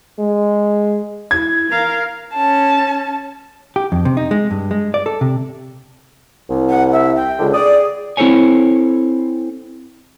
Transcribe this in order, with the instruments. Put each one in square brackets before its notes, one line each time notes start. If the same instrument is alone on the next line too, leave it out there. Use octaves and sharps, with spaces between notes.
[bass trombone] G#3
[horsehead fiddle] E4 [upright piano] G#6
[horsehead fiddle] A#4 F5
[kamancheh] C#4 A5
[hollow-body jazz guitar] G4
F2
C3
D#4
G#3
G2
G#3
D5
A4
C3
[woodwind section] C2
[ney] F#5
E5
G5
[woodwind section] C#2 D3
[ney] G#4 [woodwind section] D5 D#6
[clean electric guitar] C4 E4 A4 C5 C#5 G#5